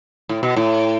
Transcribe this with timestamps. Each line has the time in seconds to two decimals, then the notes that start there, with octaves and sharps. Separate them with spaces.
0.29 A2
0.43 B2
0.56 A2